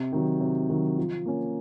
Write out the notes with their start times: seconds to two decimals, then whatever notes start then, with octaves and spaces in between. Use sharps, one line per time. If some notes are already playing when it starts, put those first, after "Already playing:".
Already playing: C3
0.12 D#3 F#3
0.41 C3
0.70 D#3 F#3
0.97 F3
1.26 A#3 C#4